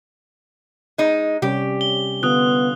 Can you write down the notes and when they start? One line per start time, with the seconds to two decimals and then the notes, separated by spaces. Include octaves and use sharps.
0.98 G#3 D#4
1.42 C3 G3 C#4 G4
1.81 G7
2.23 D3 B3 F4 D#6 F#6